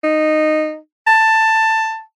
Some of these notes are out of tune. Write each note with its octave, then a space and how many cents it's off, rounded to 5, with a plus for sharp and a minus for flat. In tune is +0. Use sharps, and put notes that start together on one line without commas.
D#4 -10
A5 +10